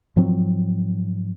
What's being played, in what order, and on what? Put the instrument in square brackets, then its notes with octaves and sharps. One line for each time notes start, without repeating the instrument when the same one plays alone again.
[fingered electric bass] G#2 F3 F#3 C4